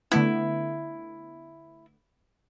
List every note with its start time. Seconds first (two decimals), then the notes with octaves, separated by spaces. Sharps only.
0.11 D3 A3 B3 E4